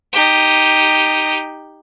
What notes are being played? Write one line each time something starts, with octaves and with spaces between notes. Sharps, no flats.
D#4 G4